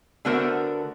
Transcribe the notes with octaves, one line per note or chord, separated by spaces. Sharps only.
D3 A3 B3 F#4 A#4 C5